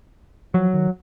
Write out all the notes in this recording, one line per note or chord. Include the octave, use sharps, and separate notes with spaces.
F3 F#3
D#3